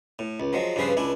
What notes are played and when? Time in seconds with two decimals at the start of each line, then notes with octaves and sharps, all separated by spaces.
0.19 A2
0.40 C#2
0.53 F3 F#3 G#3
0.76 G2 C#3 F3 G#4 B4 C5
0.97 C#2 D4 E4 G#5